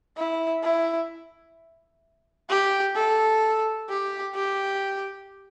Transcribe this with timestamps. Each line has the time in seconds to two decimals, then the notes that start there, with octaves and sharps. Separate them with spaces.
0.17 E4
0.63 E4
2.50 G4
2.96 A4
3.90 G4
4.35 G4